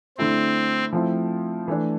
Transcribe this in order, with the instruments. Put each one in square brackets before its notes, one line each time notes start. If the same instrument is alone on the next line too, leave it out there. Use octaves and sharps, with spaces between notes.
[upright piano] D3 A3 E4 [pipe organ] C4
[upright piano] F3 A3 C4 E4
E3 A3 D4